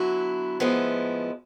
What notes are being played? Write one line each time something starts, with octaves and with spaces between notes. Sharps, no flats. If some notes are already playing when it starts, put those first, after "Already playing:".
Already playing: D3 F#3 B3 E4
A2 F3 G#3 B3 E4